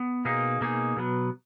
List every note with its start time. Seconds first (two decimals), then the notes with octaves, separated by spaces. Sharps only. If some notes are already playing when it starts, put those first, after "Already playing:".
Already playing: B3
0.25 B2 A#3 D#4 G#4
0.61 B2 A#3 D#4 G#4
0.96 B2 F#3 B3